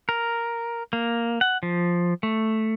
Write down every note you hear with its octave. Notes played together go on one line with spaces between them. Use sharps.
A#4
A#3
F#5
F3
A3